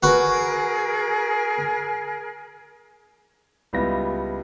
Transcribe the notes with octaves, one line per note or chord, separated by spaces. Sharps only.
F#4 G#4 A#4 B4
C#2 G3 B3 E4 F4 A#6